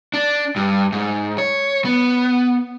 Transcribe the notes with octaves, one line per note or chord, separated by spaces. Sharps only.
D4
G2
G#2
C#5
B3